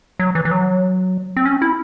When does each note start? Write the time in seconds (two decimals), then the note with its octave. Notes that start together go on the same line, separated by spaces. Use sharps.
0.19 F#3
0.35 E3
0.45 E3
0.51 F#3
1.37 C4
1.46 C#4
1.62 E4